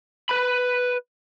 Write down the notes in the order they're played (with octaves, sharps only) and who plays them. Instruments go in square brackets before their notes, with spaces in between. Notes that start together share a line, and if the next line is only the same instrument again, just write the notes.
[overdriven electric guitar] B4 B5